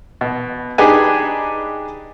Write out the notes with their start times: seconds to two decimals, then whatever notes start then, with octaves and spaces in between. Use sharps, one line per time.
0.21 B2
0.78 D4 D#4 G4 G#4 B4 G#5